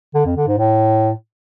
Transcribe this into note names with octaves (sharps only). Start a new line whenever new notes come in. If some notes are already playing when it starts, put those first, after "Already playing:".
D3
F2
D3
G#2
A2